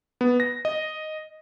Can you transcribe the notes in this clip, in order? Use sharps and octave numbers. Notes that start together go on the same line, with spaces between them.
B3
A#6
D#5